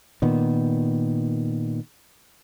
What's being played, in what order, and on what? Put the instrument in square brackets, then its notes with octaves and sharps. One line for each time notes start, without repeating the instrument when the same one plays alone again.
[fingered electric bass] A#2 D#3 B3